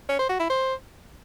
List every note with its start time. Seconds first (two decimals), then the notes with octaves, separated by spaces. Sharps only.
0.09 C#4
0.19 C5
0.29 F#4
0.39 E4
0.50 C5